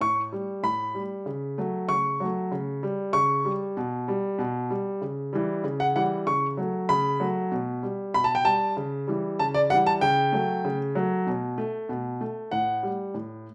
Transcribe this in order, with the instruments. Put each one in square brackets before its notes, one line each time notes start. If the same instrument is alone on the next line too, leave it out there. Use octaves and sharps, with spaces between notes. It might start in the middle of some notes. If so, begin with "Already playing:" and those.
[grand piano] A2 C#6
G3
A2 B5
G3
C#3
F#3 A3
C#3 C#6
F#3 A3
C#3
G3
C#3 C#6
G3
B2
G3
B2
G3
C#3
E3 G3
C#3
F#5
E3 G3 F#5
C#3 C#6
F#3 A3
C#3 B5
F#3 A3
B2
G3
B2 B5
A5
G5
G3 A5
C#3
E3 G3
C#3 A5
D5
E3 G3 F#5
A5
C#3 G5
F#3 A3
C#3
F#3 A3
B2
A3
B2
A3
A2 F#5
G3
A2